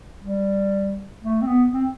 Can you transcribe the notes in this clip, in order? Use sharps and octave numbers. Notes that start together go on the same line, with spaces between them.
G3
A3
C4
B3
C4